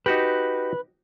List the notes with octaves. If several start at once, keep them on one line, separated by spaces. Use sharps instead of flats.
D#4 F#4 G4 B4